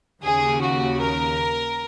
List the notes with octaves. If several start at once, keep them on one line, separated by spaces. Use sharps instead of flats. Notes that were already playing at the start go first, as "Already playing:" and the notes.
D#2 C#3 G#4
F#4
A#4